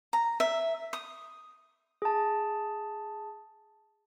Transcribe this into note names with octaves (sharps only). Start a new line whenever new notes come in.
A#5
E5
D#6
G#4 A5